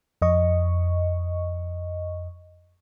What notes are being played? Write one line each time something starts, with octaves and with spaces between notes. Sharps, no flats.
F2 D#5 C#6